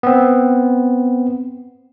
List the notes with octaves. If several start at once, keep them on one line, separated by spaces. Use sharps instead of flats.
B3 C4